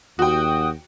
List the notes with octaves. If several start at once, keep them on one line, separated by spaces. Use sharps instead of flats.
D#2 F#4 G5 D#6